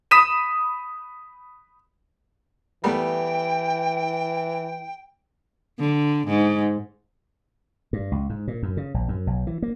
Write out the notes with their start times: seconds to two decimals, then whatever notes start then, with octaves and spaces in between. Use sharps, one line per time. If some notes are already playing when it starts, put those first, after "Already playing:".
0.11 B5 D#6 B6 D#7 E7
2.84 E3 G3 A3 B3 G5
5.79 D3
6.27 G#2
7.93 G2
8.12 C#2
8.30 G#2
8.48 A#2
8.63 F#2
8.77 C#3
8.94 A#1
9.08 F#2
9.27 B1
9.47 E3
9.62 A#3